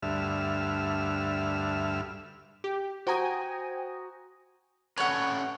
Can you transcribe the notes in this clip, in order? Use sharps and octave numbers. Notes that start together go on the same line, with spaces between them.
D2 G2 E5 F6
G4
F#4 C5 G5 G#5 A#5 D#6
C#4 A4 B4 C#5 F#5